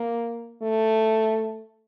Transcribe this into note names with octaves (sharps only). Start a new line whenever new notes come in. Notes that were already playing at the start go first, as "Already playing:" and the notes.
Already playing: A#3
A3